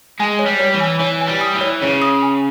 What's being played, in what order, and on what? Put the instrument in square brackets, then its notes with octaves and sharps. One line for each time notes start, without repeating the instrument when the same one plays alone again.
[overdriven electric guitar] G#3 [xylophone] G#5
[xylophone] C#5
[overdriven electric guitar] G3
[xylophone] C#5
[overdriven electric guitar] E3
[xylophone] G#5
[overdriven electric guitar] E3 [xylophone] C#5
[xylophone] G#5
[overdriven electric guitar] G3
[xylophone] D#6
[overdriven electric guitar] E3
[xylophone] C#5
[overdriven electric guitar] C#3 [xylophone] C#5
[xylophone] D#6
G#5